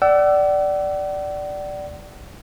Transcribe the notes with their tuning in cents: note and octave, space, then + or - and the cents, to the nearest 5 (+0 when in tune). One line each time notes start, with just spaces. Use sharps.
D5 +0 F#5 +40 E6 +10